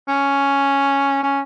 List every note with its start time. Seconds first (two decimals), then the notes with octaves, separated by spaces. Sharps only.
0.08 C#4
1.23 C#4